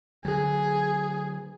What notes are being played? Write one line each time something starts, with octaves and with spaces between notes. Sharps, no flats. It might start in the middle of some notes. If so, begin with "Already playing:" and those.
D3 F#3 G#4